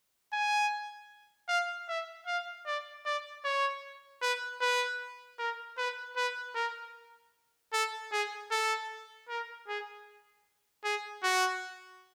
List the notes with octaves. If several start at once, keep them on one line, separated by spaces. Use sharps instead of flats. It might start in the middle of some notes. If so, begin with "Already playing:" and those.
G#5
F5
E5
F5
D5
D5
C#5
B4
B4
A#4
B4
B4
A#4
A4
G#4
A4
A#4
G#4
G#4
F#4